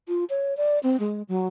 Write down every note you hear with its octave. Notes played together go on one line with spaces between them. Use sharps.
F4
C#5
D5
C4
G#3
F#3